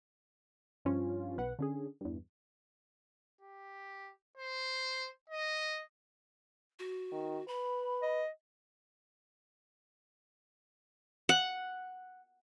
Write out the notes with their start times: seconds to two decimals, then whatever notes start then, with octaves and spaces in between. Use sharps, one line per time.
0.85 G2 F3 C#4 F4
1.38 B1 B4 F#5
1.59 D3 C#4 G#4
2.01 E2 G2
3.41 G4
4.37 C5
5.29 D#5
6.79 F#4
7.12 D#3
7.48 B4 B5
8.02 D#5
11.29 F#5